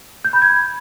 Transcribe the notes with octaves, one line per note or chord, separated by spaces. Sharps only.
G6
B5
G#6